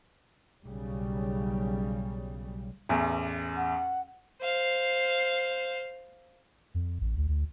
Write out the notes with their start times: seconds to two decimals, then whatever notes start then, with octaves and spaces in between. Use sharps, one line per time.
0.65 B1 C#3 G3
2.89 A1 E2
3.57 F#5
4.41 C5 F5
6.74 F2
7.01 A1
7.16 D2
7.28 D2